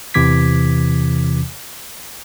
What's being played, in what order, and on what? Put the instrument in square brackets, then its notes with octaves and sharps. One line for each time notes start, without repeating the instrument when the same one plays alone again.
[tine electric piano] E2 C3 E3 D6 G#6 B6